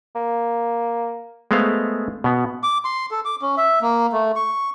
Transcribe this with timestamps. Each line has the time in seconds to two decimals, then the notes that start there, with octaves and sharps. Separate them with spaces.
0.15 A#3
1.51 G#3 A3 B3 C5 F5
2.24 B2 B3
2.63 D6
2.85 C6
3.11 A4
3.25 D6
3.42 C#4
3.57 E5
3.82 A#3
4.13 A3
4.36 C#6